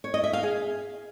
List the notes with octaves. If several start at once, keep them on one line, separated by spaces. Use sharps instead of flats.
C#5
D#5
E5
F5
G#4